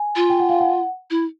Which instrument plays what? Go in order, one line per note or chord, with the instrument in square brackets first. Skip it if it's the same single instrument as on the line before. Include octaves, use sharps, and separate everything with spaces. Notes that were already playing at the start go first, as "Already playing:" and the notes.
Already playing: [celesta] G#5
[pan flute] F4
[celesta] G5
F#5
F5
F#5
[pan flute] E4